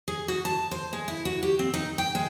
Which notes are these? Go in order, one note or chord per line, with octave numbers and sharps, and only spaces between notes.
G#4
F#4
A5
C5
G#3
E4
F#4
G4
C4
D#4
G5
G#3